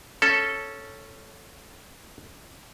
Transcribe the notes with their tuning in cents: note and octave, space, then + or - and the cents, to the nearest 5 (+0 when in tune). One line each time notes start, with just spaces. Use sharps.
C#4 +0 A4 +0